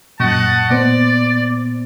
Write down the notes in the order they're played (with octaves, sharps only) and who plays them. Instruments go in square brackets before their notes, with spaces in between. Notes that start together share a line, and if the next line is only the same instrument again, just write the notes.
[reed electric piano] F#2 A#2 C#6 [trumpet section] D#5 F#5 A5
[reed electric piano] A#2 B3 C5 [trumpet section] D5